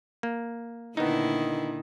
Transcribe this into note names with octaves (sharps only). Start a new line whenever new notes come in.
A#3
A#2 D3 D#3 B3 D#4 E4